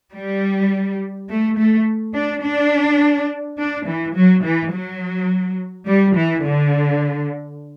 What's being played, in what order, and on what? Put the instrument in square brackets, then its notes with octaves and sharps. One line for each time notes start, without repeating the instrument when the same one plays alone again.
[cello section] G3
A3
A3
D4
D4
D4
E3
F#3
E3
F#3
G3
E3
D3